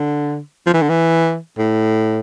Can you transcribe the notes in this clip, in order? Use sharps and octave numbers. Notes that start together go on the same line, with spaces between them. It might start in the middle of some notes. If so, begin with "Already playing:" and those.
Already playing: D3
F3
E3
D3
E3
A2